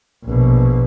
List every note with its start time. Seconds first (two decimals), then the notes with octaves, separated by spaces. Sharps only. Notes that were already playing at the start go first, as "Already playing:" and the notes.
0.24 A#1 B2